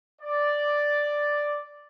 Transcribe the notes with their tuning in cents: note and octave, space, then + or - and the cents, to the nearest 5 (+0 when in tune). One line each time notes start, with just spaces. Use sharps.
D5 +0